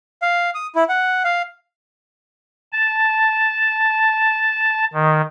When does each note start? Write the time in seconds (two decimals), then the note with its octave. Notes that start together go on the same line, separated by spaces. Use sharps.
0.22 F5
0.55 D#6
0.75 E4
0.89 F#5
1.25 F5
2.73 A5
4.93 D#3